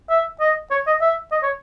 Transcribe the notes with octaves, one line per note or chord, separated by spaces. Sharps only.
E5
D#5
C#5
D#5
E5
D#5
C#5